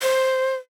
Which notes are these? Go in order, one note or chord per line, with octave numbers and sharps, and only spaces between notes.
C5